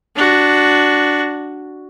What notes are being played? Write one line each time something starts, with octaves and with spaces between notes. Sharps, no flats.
D4 F#4